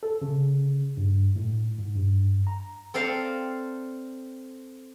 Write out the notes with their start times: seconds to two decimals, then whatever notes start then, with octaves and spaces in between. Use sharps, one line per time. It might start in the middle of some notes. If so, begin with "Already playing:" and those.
0.03 A4
0.22 C#3
0.97 G2
1.36 A2
1.78 G#2
1.95 G2
2.47 A#5
2.94 C4 A4 C5 D5 F5 A#5